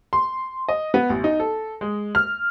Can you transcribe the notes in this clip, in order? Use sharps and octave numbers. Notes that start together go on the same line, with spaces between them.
C6
D#5
B3
A1
D#4
A4
G#3
F6